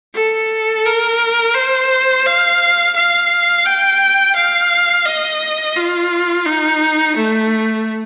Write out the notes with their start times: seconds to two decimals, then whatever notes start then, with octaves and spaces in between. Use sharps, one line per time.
0.15 A4
0.85 A#4
1.55 C5
2.25 F5
2.96 F5
3.66 G5
4.35 F5
5.05 D#5
5.76 F4
6.46 D#4
7.16 A3